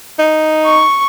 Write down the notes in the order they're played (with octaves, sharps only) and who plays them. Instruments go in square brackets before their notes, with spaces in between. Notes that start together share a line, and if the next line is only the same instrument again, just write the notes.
[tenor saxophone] D#4
[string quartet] C#6